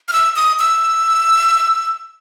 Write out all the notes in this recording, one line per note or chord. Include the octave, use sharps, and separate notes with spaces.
F6
E6
D#6
E6